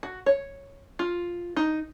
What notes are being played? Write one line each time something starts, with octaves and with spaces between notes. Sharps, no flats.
F#4
C#5
F4
D#4